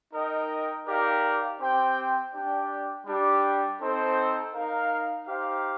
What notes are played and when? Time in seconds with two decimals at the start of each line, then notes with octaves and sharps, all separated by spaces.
0.13 D#4 A#4 D#5 G5
0.85 D#4 G4 A#4 D5 F5
1.59 C4 G4 C5 G5
2.33 D4 G4 D5 G5
3.06 G3 D4 G4
3.79 C4 D#4 A4 C5
4.54 D#4 A#4 F5
5.26 D#4 G4 C5 F5